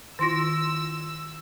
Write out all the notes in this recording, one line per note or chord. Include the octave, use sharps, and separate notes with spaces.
D#3 E4 F4 C6 E6 A#6